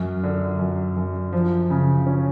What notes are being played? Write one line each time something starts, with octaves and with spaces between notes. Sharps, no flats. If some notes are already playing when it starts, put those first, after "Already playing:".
Already playing: F#2
D3
F#2
F#2
F3
C#3
C#4